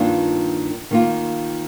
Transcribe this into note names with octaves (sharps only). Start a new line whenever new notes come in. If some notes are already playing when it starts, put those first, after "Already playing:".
Already playing: G2 D#3 A#3 D4 F4
D#3 A#3 F4